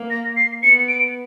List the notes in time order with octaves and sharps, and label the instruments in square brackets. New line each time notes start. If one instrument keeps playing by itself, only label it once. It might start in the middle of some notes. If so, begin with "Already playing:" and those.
Already playing: [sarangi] A#3
[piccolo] A#6
C7
[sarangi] B3 [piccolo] C#7
[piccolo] D7